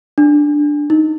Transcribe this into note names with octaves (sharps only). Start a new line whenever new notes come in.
D4
D#4